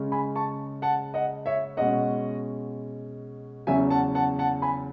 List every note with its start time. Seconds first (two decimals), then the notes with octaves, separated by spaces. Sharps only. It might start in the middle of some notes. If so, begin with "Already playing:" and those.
Already playing: C#3 G#3 C#4
0.12 G#5 B5
0.36 A5 C#6
0.82 F#5 A5
1.14 D#5 F#5
1.46 C#5 E5
1.77 B2 G#3 C#4 D#5 F#5
3.67 E2 C#3 F#3 C#4 E5 G#5
3.90 F#5 A5
4.15 F#5 A5
4.39 F#5 A5
4.62 G#5 B5